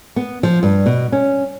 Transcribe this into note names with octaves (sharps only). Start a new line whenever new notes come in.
B3
F3
G2
B2
C#4